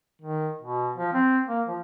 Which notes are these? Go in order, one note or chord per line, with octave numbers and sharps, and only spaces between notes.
D#3
B2
F3
C4
A#3
F3